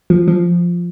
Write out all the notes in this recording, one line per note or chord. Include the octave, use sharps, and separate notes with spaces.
F3
F3